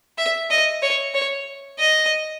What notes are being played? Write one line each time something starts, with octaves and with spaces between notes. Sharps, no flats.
E5
D#5
C#5
C#5
D#5